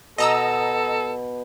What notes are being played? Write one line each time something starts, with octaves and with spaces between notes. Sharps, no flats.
B2 A4 D#5 A#5 E6